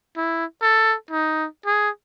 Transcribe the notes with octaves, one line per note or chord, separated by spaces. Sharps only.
E4
A4
D#4
G#4